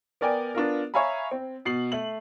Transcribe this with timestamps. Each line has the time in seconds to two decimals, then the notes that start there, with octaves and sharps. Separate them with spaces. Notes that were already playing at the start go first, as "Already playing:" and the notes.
0.21 B3 A#4 D5 G5 G#5
0.55 B3 D4 F4 A#4
0.94 C#5 E5 F5 G#5 A#5 B5
1.31 C4
1.65 B2 C7 F#7
1.92 A3 F#7